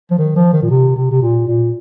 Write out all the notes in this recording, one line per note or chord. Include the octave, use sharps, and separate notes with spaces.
F3
D#3
F3
D#3
A#2
C3
C3
C3
A#2
A#2